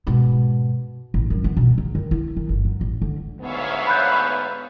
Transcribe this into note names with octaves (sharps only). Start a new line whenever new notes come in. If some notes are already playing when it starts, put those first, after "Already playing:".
G#2 B2
A1
F#2
B3
B2
C3
D#3
E4
D#3
G1
F#3
A1
D3
D2 G#2 B3 C#5 E5 F5
B5 F#6 G6